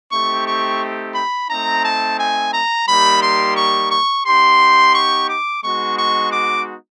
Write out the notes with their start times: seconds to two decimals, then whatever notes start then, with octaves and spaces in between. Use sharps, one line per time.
0.12 A3 C4 D#4 G4 C#6
0.47 C#6
1.15 B5
1.50 A3 C4 D#4 A#5
1.85 A5
2.19 G#5
2.54 A#5
2.88 G3 A#3 D#4 G4 B5
3.23 C6
3.57 C#6
3.91 C#6
4.26 B3 D#4 G4 C6
4.95 C#6
5.30 D6
5.64 G#3 B3 D#4 F#4 C#6
5.99 C#6
6.33 D6